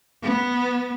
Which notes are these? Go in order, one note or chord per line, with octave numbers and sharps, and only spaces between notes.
B3